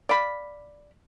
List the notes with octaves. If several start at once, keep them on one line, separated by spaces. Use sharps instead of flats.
D5 F5 B5